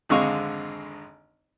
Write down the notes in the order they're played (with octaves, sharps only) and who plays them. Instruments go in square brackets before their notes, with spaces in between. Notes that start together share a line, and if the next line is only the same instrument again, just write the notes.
[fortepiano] G#1 F2 D3 G#3 F5 C#6